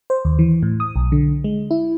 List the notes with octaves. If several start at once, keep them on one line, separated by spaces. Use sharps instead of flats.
C5
D#2
E3
A2
D#6
B1
D3
G#3
E4